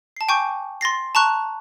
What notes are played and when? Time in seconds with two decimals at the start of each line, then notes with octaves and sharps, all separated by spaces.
0.16 A5 C7
0.29 G5 G#5 C#6 D6 G6
0.81 C6 A6 A#6 C7
1.15 A5 A#5 C#6 F#6